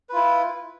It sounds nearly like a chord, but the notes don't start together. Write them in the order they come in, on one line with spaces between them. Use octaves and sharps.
B4 F4 E4